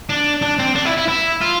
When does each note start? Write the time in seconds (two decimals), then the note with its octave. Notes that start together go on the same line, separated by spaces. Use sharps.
0.09 D4
0.42 D4
0.59 C4
0.76 D4
0.85 E4
0.98 E4
1.08 E4
1.41 F4